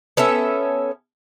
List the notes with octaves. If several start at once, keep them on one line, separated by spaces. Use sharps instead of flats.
B3 C#4 A4 E5